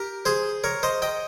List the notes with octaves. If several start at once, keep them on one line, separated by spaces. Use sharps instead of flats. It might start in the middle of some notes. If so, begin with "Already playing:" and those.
Already playing: G4 A#4
G#4 C5
A#4 C#5
C5 D#5
D#5 G5